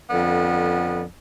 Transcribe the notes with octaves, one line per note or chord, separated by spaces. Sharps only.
F2 D3 B3